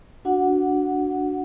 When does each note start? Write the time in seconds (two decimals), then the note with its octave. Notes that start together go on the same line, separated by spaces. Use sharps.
0.25 D4 F#4 F#5